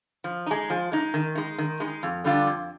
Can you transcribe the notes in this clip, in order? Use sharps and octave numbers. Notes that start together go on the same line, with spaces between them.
F3
G#3 D#4
F3
G#3 D#4
D#3
G#3 D#4
D#3
G#3 D#4
F2
D3 G3 D4 F4
F2